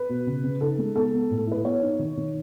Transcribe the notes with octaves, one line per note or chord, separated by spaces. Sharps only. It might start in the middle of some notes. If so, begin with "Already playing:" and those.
Already playing: B4
B2
C#3
C#3
D#4 A4
G#3
B3 A4
B3
A2
A4
E4 B4
B3 C#5
D#4
D#3
D#3